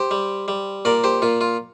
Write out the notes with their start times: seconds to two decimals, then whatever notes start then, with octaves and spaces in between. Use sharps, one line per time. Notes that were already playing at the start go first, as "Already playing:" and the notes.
Already playing: G4 C5
0.11 G3
0.48 G3
0.85 A#2 A#4 D5
1.04 G4 C5
1.22 A#2 F4
1.41 F4